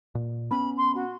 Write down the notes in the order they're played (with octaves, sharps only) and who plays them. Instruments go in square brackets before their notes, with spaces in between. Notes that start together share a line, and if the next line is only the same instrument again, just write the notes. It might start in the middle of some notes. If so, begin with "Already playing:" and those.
[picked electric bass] A#2
[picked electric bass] B3 C#4 [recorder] B5
[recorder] C6
F#4